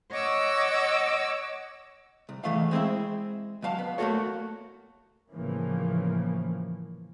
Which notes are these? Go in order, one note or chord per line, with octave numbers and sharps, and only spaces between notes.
C#5 D#5 F#5 D6 E6
C2
E2 E3 A3 D#5 F5
G#3 C4 E4 E5
C#2 F#3 F5 A5
B3
A3 A#3 C#4 F#4 A4 C#5
C2 A2 C#3 E3 F3 A#3